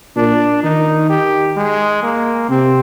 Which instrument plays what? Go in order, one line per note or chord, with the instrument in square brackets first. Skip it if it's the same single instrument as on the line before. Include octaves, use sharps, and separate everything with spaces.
[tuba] A#2 [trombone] D4
[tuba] D#3 [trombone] D#4
[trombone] G4
G#3
A#3
[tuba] C3 [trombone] C4